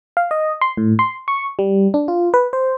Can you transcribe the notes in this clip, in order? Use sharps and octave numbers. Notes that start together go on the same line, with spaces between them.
F5
D#5
C6
A2
C6
C#6
G3
D4
F4
B4
C5